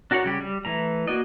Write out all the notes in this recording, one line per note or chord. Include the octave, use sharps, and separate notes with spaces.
D4 F#4 A#4 C#5 F#5
C#3 G3 G4
G3
E3 A3 A#5
A#3 F#4 D5 D#5